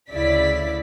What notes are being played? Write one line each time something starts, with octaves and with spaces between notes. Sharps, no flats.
D2 C#3 E4 D5 B6